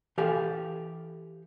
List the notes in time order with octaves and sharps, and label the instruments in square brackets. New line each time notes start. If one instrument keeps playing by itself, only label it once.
[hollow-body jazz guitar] E3 G4 A4 F5 G#5